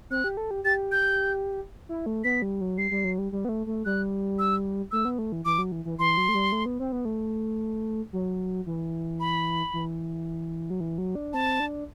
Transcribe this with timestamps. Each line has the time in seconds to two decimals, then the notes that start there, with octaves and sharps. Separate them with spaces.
0.10 C4 F#6
0.24 G4
0.37 A4
0.51 G4
0.64 G4 A6
0.92 G6
1.89 E4
2.06 A3
2.24 B3 B6
2.42 G3
2.61 F#3
2.78 G3 C7
2.91 G3
3.04 F#3
3.18 G3
3.32 G3
3.45 B3
3.49 A3
3.67 A3
3.85 G3 F#6
4.39 E6
4.91 A3 E6
5.05 B3
5.19 A3
5.32 E3
5.45 E3 D6
5.58 F#3
5.72 E3
5.85 E3
5.99 E3 C6
6.17 F#3
6.29 A3
6.34 G3
6.52 A3
6.66 B3
6.80 C4
6.92 B3
7.05 A3
8.13 F#3
8.66 E3
9.20 B5
9.73 E3
10.70 F#3
10.80 E3
10.98 F#3
11.15 D4
11.33 C4 A5
11.60 D4